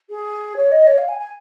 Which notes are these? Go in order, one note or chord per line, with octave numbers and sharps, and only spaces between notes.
G#4
C#5
D#5
C#5
F5
G#5
G#5